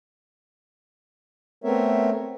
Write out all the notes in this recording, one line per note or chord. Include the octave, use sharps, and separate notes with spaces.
A3 B3 C4 A#4 C#5 E5